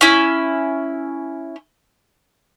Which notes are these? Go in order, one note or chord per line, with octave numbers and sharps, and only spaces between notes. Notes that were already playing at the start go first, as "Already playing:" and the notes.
C#4 E4